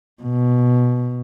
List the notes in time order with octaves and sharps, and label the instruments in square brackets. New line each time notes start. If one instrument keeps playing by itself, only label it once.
[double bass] B2